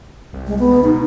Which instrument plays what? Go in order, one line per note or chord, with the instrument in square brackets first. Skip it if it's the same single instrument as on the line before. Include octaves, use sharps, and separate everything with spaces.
[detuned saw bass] C2
[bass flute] G#3
B3
[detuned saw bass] D2
[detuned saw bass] B2 [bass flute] D#4